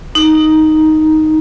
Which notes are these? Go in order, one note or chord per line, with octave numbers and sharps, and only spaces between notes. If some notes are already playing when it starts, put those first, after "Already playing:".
D#4